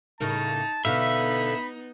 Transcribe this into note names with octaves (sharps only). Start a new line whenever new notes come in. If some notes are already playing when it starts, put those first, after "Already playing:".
A2 C#3 A#3 D#4 A5
B2 D3 B3 D#4 E5 F5 B5